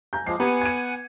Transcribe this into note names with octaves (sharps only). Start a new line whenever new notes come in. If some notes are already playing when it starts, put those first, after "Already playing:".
G#5 A#5 G6
F3 G#3 D6 C7
B3 G4 F#5 G#5 A#5
G#6 D#7